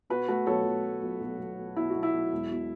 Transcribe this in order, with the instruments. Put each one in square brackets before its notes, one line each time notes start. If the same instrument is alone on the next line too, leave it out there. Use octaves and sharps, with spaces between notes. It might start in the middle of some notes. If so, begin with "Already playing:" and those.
[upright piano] B2 F#4 B4
A3 F#4 B4
B1 A4 C#5
B1
A3
B1
B1
B1
B2
B2 E4
B1 F#4
E4
B1
E1
B2